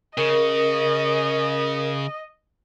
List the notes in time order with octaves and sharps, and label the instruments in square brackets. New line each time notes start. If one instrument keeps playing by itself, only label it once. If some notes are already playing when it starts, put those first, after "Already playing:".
[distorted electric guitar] C#3 [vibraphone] A#4 [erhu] D#5